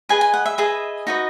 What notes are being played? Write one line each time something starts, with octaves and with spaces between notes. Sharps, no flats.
G#4 B4 D#5 G#5
G#5
F#5
E5
G#4 B4 D#5 E5
D#4 F#4 B4 D#5